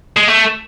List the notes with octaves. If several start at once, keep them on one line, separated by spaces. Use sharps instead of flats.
G#3
A3